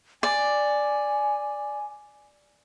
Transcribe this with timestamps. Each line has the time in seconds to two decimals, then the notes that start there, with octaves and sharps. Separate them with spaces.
0.23 D5 G#5